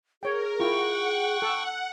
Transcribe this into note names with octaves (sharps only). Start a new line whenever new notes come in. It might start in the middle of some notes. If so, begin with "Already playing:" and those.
G#4 A#4 C#5 G5
E4 F4 F#5 G5 C#6
A4